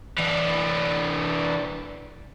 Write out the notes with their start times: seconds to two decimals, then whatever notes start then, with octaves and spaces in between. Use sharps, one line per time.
0.18 E3 D4